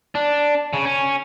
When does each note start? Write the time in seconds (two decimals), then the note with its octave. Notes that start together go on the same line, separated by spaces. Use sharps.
0.15 D4
0.73 C#3
0.85 C#4